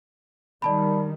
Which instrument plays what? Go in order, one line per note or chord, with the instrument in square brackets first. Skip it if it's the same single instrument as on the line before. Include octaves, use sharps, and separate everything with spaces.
[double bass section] D#3 G3 [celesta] D5 A5 B5